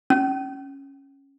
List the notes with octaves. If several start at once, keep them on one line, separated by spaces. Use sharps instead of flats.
C#4